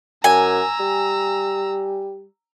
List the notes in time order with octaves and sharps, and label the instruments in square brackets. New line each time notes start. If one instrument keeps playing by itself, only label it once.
[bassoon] F#2 [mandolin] G#5 [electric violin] A#5 E6
[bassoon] G3